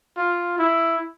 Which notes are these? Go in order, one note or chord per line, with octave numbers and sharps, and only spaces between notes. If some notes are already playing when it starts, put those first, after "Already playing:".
F4
E4